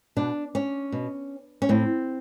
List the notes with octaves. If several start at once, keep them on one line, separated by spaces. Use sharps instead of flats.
B2 D4
C#4
B2
C#4
A2 C4